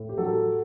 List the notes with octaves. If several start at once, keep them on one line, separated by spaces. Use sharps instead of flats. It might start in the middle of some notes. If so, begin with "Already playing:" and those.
Already playing: A2
G4
F#3 A4